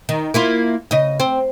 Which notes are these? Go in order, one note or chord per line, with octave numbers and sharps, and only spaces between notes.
D#3
A#3 E4 F4
C#3 D#5
C4